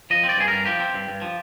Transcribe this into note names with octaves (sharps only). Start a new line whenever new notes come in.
F3 D#5
C4
D5
G2 G#4
G2 A#4
F3 G4
C4
G2
G2
F3